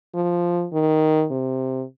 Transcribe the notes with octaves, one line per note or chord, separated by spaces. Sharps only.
F3
D#3
C3